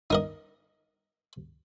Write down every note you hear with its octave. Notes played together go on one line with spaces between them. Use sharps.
D#4 A#4 D#5